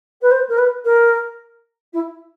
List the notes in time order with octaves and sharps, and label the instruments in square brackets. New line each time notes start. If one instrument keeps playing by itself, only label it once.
[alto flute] B4
C5
A#4
B4
A#4
E4